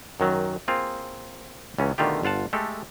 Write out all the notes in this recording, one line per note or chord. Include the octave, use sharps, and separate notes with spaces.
F#2 D#3 F#3
A#3 C4 F4 G#4
C#2 E3 C#4
B2 D3 D#3 A3 F4 G4
G1 F4 F#5 A5
G#3 A3 G4 A4